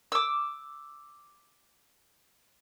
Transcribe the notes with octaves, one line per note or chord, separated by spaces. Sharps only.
D6 E6